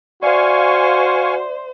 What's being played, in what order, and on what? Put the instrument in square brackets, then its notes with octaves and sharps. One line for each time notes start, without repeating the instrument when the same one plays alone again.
[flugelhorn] F#4 [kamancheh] C5 [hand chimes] D5 E5 [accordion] F5 G#5 C#6